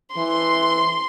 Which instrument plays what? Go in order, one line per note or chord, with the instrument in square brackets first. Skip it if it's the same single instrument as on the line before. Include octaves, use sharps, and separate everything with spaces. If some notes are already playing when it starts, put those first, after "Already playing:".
[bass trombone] E3 [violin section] C6